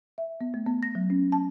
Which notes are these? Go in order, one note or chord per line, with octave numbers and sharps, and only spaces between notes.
E5
B3
A3
B3
A#6
F#3
C#4
A5